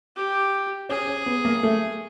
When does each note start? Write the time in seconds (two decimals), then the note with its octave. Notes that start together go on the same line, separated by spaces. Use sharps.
0.17 G4
0.89 C#4 G#4
1.07 C#4
1.26 B3
1.45 A#3
1.63 A3